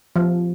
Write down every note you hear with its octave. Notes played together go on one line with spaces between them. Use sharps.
F3